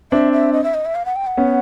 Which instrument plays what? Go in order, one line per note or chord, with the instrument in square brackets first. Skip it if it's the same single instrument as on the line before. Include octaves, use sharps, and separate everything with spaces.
[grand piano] C4 D4 [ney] E5
[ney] E5
D#5
E5
D#5
E5
F5
F#5
G5
F#5
[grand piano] B3 C#4